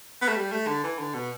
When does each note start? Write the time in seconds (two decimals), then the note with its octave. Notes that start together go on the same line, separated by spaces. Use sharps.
0.22 B3
0.29 A3
0.37 G3
0.52 A3
0.67 D3
0.84 E3
0.99 D3
1.14 B2